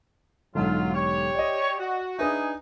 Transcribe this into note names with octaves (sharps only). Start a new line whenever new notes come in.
B1 G#2 D3 F#3 F4
G4 C#5
D5 D#5
F#4
D4 D#4 G#4 B4 E5 G#5